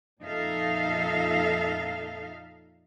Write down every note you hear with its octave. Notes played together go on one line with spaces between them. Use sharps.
F2 A#2 D#4 A4 E5 F5